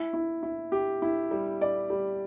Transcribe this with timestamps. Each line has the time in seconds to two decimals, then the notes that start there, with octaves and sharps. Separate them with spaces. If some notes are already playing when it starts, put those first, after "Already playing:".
Already playing: E4
0.13 E4
0.43 E4
0.72 G4
1.02 E4
1.31 G3
1.61 D5
1.90 G3